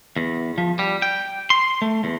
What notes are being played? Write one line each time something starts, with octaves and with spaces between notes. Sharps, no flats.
E2
F3
G3
G5
C6
A3
E2